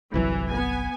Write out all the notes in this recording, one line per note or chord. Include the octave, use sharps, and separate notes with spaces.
G1 C2 E3 F#3
B3 G#5